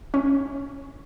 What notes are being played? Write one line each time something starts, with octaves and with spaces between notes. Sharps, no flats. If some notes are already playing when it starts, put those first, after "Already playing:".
C#4